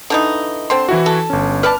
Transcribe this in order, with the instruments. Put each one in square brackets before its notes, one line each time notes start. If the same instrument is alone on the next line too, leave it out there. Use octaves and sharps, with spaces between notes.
[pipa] D3 E3 D#4
[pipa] D3 C4 [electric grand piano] C5 C6
[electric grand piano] E3 E4 F#4
[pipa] A4
[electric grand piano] G1 C#4
[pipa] B4 D5 A5 [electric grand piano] F6